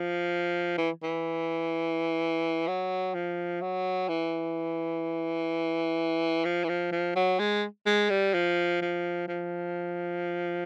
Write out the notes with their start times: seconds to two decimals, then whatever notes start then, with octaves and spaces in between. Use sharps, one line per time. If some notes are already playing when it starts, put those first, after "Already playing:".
Already playing: F3
0.78 E3
1.03 E3
2.67 F#3
3.14 F3
3.62 F#3
4.08 E3
6.45 F3
6.64 E3
6.69 F3
6.92 F3
7.16 F#3
7.39 G#3
7.87 G#3
8.10 G3
8.34 F3
8.82 F3
9.28 F3